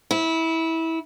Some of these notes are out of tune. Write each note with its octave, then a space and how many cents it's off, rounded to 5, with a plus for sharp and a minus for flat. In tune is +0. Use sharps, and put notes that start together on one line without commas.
E4 -20